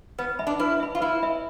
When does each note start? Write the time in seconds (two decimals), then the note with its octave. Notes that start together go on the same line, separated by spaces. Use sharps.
0.18 B3 B4
0.39 E5 B5
0.47 D4
0.60 E4 B4
0.80 E5 B5
0.95 F4
1.01 E4 B4
1.22 E5 B5